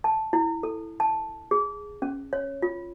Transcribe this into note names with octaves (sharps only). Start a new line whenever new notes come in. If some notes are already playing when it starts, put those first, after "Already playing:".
A5
E4
A4
A5
G#4
C#4
C#5
F4